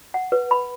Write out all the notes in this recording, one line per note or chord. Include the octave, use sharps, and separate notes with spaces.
F#5
B4
B5